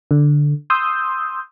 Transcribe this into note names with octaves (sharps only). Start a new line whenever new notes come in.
D3
C6 D#6 E6 G6